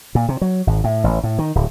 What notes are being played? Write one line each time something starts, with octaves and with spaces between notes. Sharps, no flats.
A#2
C3
F#3
G#1
A2
A1
A2
D#3
D1